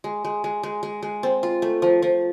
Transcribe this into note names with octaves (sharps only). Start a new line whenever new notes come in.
G#3
G#3
G#3
G#3
G#3
G#3
C4
F4
A3
F3
F3